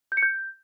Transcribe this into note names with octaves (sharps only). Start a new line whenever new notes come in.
G6
C#7
G6